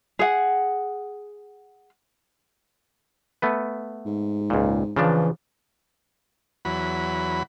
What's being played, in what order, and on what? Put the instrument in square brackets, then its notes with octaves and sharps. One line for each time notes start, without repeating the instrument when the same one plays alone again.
[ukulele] G#4 F#5
[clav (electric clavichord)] A3 B3 B4
[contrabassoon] G#2
[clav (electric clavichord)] C#2 A#2
[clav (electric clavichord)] C#3 F3 D4 [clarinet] E3
[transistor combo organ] E2 F#3 B5